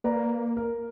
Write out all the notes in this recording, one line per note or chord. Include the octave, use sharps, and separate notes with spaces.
A#3 B4 D5 A#5
A#4